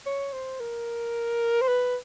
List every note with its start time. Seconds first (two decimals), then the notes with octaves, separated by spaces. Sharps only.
0.06 C#5
0.33 C5
0.60 A#4
1.61 C5
1.68 B4